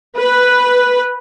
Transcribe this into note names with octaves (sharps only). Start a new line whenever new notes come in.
B4